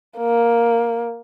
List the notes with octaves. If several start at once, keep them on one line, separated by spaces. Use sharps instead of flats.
A#3